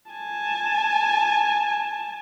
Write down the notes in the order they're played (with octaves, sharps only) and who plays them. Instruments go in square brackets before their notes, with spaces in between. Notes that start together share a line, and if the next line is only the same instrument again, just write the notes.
[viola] G#5 A5